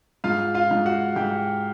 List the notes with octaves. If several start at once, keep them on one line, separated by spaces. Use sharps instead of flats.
G#2 F4 F5
F4 F5
G#2
F#4 F#5
G#2 G4 G5